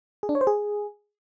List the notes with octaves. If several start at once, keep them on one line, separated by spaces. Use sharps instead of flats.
G#4
D4
C#5
C5
G#4